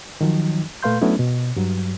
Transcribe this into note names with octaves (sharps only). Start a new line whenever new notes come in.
D#3 F3 F#3 D#4
A#2 A3 B4 F5 C6 G6
F#3 A3 B3 C#4 D4 E4
B2
G2 F#3